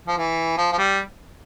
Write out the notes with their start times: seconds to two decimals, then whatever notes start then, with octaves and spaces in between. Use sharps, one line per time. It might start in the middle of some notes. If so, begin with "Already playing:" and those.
0.08 F3
0.18 E3
0.57 F3
0.72 F3
0.78 G3